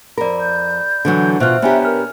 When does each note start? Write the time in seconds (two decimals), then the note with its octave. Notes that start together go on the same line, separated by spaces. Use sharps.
0.18 F2 A#4 D5 B5
0.40 G6
1.05 D3 E3 F#3
1.40 B2 F4 C5 E5 F6 F#6
1.62 B3 D4 G4 C#5 E5 G#5 A#5
1.85 A#4 F6